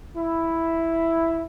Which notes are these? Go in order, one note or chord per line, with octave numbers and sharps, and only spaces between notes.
E4